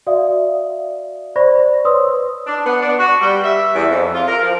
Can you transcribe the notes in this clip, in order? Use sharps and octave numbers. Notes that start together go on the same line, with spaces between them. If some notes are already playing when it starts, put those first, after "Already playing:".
F#4 D5 E5 F5 D#6
C5 D5 B5 C#6 A#6
B4 C#5 D5 C6 D#6 E6
D4
B3
D4
F#4
G3
E5
E2
F2
F4
A#4
F3